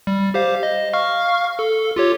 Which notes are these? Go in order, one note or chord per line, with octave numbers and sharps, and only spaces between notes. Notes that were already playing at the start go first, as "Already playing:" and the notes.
G3
G4 C5 F5
D#5
F5 C#6 F6
A4
F4 G4 C#5